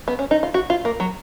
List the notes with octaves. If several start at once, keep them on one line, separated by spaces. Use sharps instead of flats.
B3
C#4
D#4
F4
F#4
F4
A#3
F#3